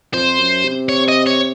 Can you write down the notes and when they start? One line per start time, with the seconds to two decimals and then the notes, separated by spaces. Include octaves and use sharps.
0.13 F2 C5
0.39 F#2
0.64 C3
0.89 C#5
1.08 D#5
1.27 C#5